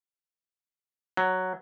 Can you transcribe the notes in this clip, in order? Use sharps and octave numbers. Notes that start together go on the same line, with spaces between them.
F#3